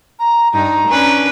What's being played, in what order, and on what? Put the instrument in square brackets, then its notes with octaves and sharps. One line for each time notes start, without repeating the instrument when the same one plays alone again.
[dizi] A#5
[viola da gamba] G2 D#4 [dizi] A#5
[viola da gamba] C#4 D4 B4